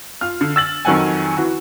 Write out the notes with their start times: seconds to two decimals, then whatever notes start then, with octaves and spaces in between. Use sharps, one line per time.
0.21 F4 F6
0.41 D3
0.56 E6 A6 F#7
0.85 F2 D#3 F#3 F#5 G#5
1.37 E3 F#4